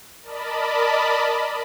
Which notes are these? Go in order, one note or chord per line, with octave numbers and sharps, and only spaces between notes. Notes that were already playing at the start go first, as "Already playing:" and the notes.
A#4 D5 D#5 A5 B5